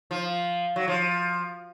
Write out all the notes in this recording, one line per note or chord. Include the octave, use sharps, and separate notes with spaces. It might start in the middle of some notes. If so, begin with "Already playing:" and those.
F3
F#3
F3